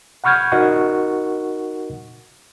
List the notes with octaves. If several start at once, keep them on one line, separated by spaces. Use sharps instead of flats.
F#5 B5 C#6 F6 G6 G#6
D#4 F#4 A#4 D#5 F#5 C#6